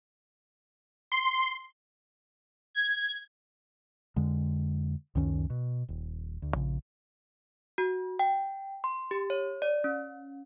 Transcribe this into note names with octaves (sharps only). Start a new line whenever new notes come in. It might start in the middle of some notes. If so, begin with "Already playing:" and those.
C6 C7
G#6
F2 D3 G#3
C#2 F#2 D#3 C#4
B2
D#1
D2
A#1 C#3
F#4
G5
C6
G4
C#5
D5
C#4